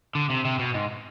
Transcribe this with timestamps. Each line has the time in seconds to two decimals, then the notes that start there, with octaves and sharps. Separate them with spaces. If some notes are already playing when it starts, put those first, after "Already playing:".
0.15 D3
0.30 C3
0.45 C3
0.59 B2
0.75 G#2